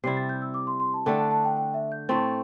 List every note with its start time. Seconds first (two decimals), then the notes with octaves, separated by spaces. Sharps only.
0.04 C3 G3 E4 C7
0.17 A6
0.29 G6
0.42 E6
0.54 D6
0.67 C6
0.80 C6
0.94 A5
1.06 D3 A3 D4 A4 G5
1.19 A5
1.31 A5
1.45 G5
1.57 G5
1.74 E5
1.92 G6
2.09 A2 A3 C4 A6